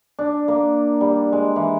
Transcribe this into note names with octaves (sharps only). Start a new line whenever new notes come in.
D4
A#3
G3
G#3
E3